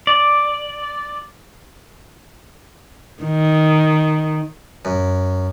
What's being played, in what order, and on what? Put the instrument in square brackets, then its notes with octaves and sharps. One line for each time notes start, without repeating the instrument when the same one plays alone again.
[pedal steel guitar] D5
[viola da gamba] D#3
[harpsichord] F#2